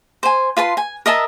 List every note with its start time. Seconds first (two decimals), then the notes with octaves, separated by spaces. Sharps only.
0.23 C5 G#5
0.57 F4 B4 A5 C6
0.77 G#5
1.06 A#4 D#5 E5 A5